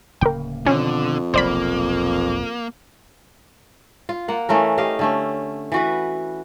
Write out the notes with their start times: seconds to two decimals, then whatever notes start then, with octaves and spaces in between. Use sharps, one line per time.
0.21 D1 C#3 A#3 A#4 G5
0.67 F2 B2 D3 D#3 C#4
1.34 F1 B1 A#3 C5 D5 B5
4.09 F4
4.28 A#3 F#5
4.49 E3 A3 C#4 A#4
4.78 G4 D#5 F5
4.99 D3 A3 C#4
5.72 E3 F#4 B4